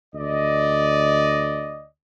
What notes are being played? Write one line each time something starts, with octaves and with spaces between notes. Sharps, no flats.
D2 D5 D#5